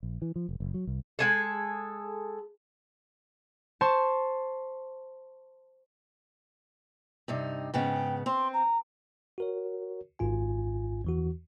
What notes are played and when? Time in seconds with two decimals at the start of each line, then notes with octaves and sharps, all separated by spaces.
0.03 A#1
0.22 E3
0.36 F3
0.49 F1
0.60 F#1
0.74 F#3
0.87 C2
1.19 G#3 G#4 A4
3.81 C5 A5 C6 C#6
7.28 G2 C3 D#4
7.74 G#2 C#3 B3 G5
8.26 C4 C6
8.53 A#5
9.38 F#4 A#4 C#5
10.19 G#1 G#2 F4 G#5
11.04 E2 E3 F#4